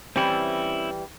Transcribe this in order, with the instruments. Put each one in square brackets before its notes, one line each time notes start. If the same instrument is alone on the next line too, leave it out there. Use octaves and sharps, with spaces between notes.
[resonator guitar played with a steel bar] E3 G3 [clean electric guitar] C4 C#4 E4